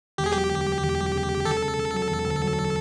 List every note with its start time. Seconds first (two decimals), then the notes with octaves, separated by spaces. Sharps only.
0.18 E1 G4
0.26 G#4
0.33 F#3 G4
0.50 D2
0.66 F#3
0.82 E1
0.98 F#3
1.14 C#3
1.30 C#3
1.45 E1 A4
1.62 C#3
1.78 C#3
1.93 F#3
2.10 E1
2.26 D2
2.42 F#3
2.58 F#3